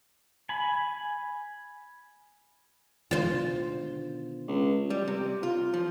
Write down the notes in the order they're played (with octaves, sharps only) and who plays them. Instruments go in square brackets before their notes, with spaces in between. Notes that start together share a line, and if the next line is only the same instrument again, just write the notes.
[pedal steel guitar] G#5 B5
[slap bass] B2 D3 D#3 [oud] F4 C5
[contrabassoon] C#2
[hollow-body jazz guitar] G3
C3
F4
F3